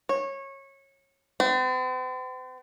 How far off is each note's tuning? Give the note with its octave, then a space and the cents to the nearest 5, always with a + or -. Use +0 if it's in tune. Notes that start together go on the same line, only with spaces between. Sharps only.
C#5 -20
C4 -45